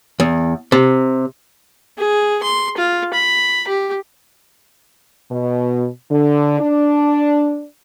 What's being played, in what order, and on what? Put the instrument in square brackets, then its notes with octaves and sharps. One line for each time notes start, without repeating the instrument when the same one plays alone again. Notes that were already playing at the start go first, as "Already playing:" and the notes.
[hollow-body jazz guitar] E2
C3
[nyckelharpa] G#4
C6
F4
B5
G4
[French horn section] B2
D3
D4